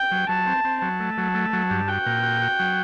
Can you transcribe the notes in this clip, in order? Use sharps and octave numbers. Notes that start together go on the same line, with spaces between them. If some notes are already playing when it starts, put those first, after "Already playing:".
Already playing: G5
F#3
F#3 A5
C4
C4
F#3 A5
A3
F#3
A3
F#3
G2
F#4 G5
A#2
F#4
F#4
F#3